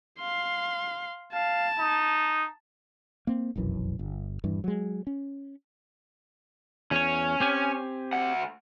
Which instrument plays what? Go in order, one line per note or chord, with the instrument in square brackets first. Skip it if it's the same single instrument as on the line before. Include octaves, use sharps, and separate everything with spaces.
[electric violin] F5 C6
[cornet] F5 [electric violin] A5
[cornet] D#4
[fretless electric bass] A#3 C4
F1 B1 F#2 E3
G1
D#1 G2 E3
F#3 G#3
C#4
[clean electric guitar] E2 C#5 [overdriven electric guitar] C#4
[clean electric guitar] C4 G4 G#5
[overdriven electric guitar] D2 F#5